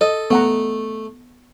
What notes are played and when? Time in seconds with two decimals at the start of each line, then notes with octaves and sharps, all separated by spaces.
0.01 A4 D#5
0.31 A3 B3 F#5 A#5